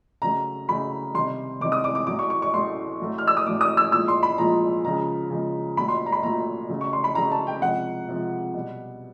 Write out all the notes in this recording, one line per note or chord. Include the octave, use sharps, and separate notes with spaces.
C#3 F#3 A3 A#5
C#3 F#3 A3 B5
C3 D#3 G3 C6
C3 D#3 G3 D6
D#6
D6
D6
A2 F#3 A3 D6
C#6
C#6
C#6
A2 F#3 A3 C6
A2 F#3 A3
F6
E6
D#6
A2 F#3 A3 D6
D#6
E6
A#2 F3 G#3 E6
C6
B5
A#2 F3 G#3 A#5
C#3 F3 G#3 A#5
C#3 F3 G#3
A#2 F#3 A3 B5
C6
A#5
B5
A#2 F#3 A3 A#5
C#3 F#3 A3
C#6
C6
B5
C#3 F#3 A3 A#5
A5
G5
C3 F3 G#3 F#5
C3 F3 G#3
B2 G3